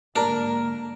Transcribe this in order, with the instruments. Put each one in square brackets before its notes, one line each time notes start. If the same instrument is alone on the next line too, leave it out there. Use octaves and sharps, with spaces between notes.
[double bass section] G#2 D3 A#3 [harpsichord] D4 [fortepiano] A#4